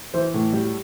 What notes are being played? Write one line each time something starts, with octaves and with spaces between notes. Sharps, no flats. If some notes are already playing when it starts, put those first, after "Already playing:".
E3 C5
A2
G3